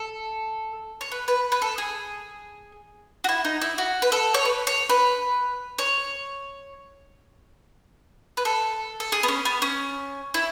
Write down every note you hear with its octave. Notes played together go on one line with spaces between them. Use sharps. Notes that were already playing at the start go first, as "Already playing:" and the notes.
Already playing: A4
C#5
B4
B4
B4
A4
G#4
F#4
E4
D#4
E4
F#4
B4
A4
C#5
B4
C#5
B4
C#5
B4
A4
A4
G#4
B3
C#4
B3
C#4
E4